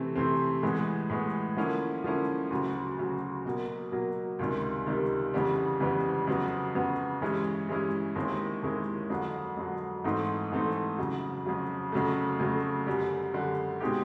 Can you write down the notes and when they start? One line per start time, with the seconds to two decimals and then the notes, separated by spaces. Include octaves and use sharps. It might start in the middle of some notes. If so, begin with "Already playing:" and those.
Already playing: C3 E3 A3 C4
0.16 C3 E3 A3 C4
0.63 A2 E3 G#3 B3
1.09 A2 E3 G#3 B3
1.57 D3 F3 A#3 C#4 E4
2.04 D3 F3 A#3 C#4 E4
2.51 D2 C#3 F#3
2.98 D2 C#3 F#3
3.45 B2 F#3 A#3
3.92 B2 F#3 A#3
4.39 C#2 C3 D#3 G3
4.86 C#2 C3 D#3 G3
5.34 F2 C#3 E3 G3 B3
5.80 F2 C#3 E3 G3 B3
6.27 F2 C#3 F#3 B3
6.75 F2 C#3 F#3 B3
7.22 G2 E3 G#3 C#4 E4
7.69 G2 E3 G#3 C#4 E4
8.16 D#2 D#3 G#3 C4 E4
8.63 D#2 D#3 G#3 C4 E4
9.10 F2 D3 F#3
9.57 F2 D3 F#3
10.04 G#2 E3 A3 C4 D#4
10.51 G#2 E3 A3 C4 D#4
10.98 F2 C#3 F#3
11.45 F2 C#3 F#3
11.92 F2 C#3 F#3 A3
12.39 F2 C#3 F#3 A3
12.87 F#2 D3 G3
13.33 F#2 D3 G3
13.80 B2 G#3 C4 D#4 G4